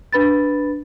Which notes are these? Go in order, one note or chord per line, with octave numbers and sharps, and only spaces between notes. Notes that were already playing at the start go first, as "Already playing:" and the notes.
D4 B4 B5 A6